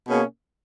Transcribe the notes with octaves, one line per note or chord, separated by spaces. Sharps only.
B2 A#3 C#4 G#4